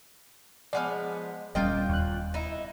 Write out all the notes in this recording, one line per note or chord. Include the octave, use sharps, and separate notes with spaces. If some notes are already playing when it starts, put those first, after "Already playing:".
F3 G#3 B3 D5 F#5 F6
D#1 A#2 G3 C#4 F4 D#5 F5 G5
D#2 F#6
D#4 E4